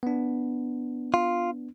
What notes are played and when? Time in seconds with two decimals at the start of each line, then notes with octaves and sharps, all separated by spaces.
0.03 B3 D4
1.14 F4